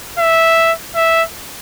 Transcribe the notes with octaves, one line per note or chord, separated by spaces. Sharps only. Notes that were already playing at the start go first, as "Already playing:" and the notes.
E5
E5